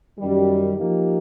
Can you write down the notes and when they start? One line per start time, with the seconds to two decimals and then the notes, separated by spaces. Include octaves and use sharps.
0.19 F#2 D#3 G3
0.77 F3 A#3 D#4 G4